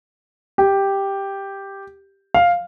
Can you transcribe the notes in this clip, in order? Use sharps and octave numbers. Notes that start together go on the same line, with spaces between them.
G4
F5